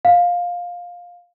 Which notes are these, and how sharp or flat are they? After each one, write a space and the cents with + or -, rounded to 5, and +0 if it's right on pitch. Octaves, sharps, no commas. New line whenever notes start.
F5 +15